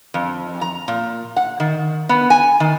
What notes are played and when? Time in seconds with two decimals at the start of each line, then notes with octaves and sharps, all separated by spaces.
0.14 F2
0.61 A#5
0.88 A#2
1.36 F#5
1.60 D#3
2.09 B3
2.30 G#5
2.60 D#3